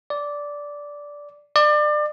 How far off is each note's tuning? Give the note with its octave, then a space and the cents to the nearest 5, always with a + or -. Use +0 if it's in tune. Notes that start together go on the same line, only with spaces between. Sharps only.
D5 -10
D5 +30